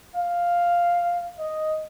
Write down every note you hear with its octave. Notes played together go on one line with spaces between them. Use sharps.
F5
D#5